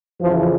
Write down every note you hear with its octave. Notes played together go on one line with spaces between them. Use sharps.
F2 C#3 E3 F3